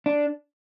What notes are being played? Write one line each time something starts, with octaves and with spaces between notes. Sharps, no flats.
D4